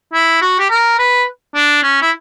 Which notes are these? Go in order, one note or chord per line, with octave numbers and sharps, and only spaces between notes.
E4
F#4
G4
A#4
B4
D4
C#4
E4